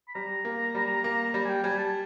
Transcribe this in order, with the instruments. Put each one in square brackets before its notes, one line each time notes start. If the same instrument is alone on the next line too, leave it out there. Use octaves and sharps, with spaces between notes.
[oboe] B5
[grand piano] G3 [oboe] A#5
[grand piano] A#3
G3
A#3
G3
[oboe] G#5
G5
[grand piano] G3 [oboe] G#5
[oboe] A5